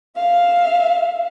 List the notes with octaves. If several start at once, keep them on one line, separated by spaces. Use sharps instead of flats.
E5 F5